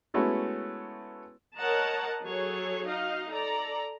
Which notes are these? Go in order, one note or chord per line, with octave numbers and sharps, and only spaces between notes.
G#3 A3 B3 C#4 E4 F#4
A#4 C#5 D#5 F#5 A5 A#5
F#3 G#4 A4 C#5
D#4 F#4 D#5 F5
A4 D5 A#5